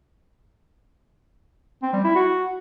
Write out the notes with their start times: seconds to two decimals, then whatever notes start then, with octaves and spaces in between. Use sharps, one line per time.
1.82 C4
1.93 G3
2.04 E4
2.15 F#4